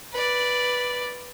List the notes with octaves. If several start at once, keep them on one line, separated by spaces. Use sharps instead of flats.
B4 D5